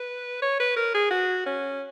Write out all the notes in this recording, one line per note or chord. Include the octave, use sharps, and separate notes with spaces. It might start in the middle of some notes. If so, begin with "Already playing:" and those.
Already playing: B4
C#5
B4
A#4
G#4
F#4
C#4